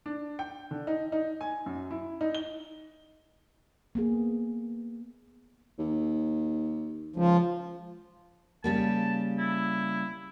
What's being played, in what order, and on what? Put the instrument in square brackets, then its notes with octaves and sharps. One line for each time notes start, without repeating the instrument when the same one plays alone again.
[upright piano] D4
G5
D3
D#4
D#4
G#5
F#2
E4
D#4
G7
[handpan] A#3 B3 G#4
[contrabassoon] D#2
[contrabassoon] C#2 [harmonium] F3
[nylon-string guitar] C#3 G3 A#3 [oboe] A5
[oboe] E4